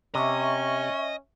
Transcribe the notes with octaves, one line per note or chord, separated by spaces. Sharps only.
C3 C#4 D#5 E5 C#6